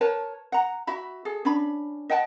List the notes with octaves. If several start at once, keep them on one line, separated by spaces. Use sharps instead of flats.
A#4 B4 C#5 A5
F#5 A#5
F#4 E5 B5
G#4 A4
C#4 D4 B5
D#5 F#5 G5 A5